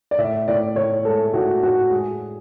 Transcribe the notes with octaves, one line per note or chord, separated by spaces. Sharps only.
D5
A2 E5
A2 D5
A2 C#5
G#3 A4
A2 F#4
A2 F#4
G#3 G#4